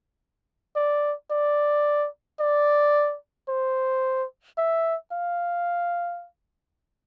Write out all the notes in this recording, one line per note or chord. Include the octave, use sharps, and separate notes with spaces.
D5
D5
D5
C5
E5
F5